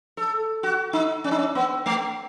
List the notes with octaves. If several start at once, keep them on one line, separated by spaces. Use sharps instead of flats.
A4
F#4
D#4
C#4
D#4
C#4
B3
A3